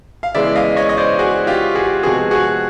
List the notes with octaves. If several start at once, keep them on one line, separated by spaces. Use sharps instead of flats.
F5
C#3 E3 G#3 B3 D5 E5
D#5 F5
C#5 D#5
D#5
C5 D5
F#4 G#4
F4 G4
F#4 G#4
C3 F3 G#3 B3 F#4 G#4
F#4 G#4